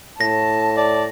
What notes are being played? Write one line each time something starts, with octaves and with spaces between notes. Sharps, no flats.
A2 A5 A#6
D5